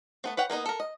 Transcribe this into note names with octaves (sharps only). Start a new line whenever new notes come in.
A3 B3 C4
B4 C#5 F#5 G5
A#3 B3 D#4 D#5
A4 A#4
D#5